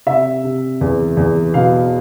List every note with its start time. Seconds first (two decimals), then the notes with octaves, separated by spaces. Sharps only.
0.06 C3 E5
0.44 C3
0.81 E2
1.17 E2
1.54 B2 F5